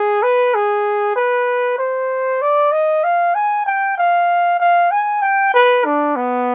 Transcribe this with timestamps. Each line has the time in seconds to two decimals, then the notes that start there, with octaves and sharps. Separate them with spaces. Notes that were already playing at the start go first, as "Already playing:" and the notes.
Already playing: G#4
0.23 B4
0.54 G#4
1.16 B4
1.78 C5
2.42 D5
2.72 D#5
3.04 F5
3.35 G#5
3.66 G5
3.97 F5
4.60 F5
4.91 G#5
5.22 G5
5.54 B4
5.85 D4
6.16 B3